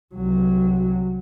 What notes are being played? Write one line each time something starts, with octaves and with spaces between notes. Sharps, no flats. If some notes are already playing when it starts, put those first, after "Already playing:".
C2 F#3